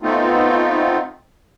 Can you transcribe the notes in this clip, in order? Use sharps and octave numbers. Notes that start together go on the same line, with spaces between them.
A3 B3 C4 D#4 F4